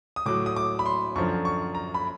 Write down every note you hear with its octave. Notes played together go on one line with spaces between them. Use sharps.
D#6
A2 F#3 D6
D#6
D6
B5
C6
F#2 D3 F3 C#6
C#6
A#5
B5